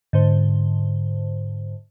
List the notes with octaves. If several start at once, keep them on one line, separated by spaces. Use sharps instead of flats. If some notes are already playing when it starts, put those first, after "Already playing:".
G#2 D3 C5